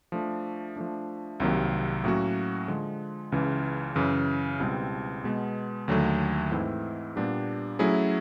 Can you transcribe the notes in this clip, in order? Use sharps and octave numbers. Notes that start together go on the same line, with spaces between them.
F3 A3 D4
F3 A3 D4
C2 C3 D#3 F#3 A#3
A2 F#3 A#3 C#4 F#4
D3 F3 G#3
C#2 C#3 E3
F#2 C#3 E3
C#2 B2 G3 C4 E4
B2 G#3 B3
D#2 D3 F#3 A3
G#2 E3 A3 C4 E4
A#2 G3 B3 D4 G4
F#3 A3 C#4 E4 G#4